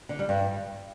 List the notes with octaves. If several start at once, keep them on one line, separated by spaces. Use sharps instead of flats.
D3
G3
G2